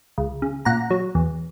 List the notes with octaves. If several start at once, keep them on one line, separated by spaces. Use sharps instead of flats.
C#2
C#3
A#2 F#5 A#5
F#3
E2